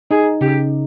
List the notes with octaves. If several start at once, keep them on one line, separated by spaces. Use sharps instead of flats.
D#4 G#4
C#3 G4